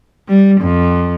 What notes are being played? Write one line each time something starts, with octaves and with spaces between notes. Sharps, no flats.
G3
F2